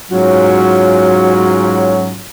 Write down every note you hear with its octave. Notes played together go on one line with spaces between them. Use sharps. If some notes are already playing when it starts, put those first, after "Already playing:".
G#2 F#3 C#4 F4 F#4